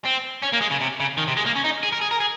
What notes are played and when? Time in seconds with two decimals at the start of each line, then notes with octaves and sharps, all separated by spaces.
0.06 C4
0.43 C#4
0.53 A#3
0.61 G#3
0.71 C#3
0.81 C3
1.00 C#3
1.17 D#3
1.27 C3
1.37 G#3
1.46 A#3
1.55 C#4
1.64 D#4
1.83 G#4
1.93 A#4
2.02 G#4
2.11 A#4
2.20 G#4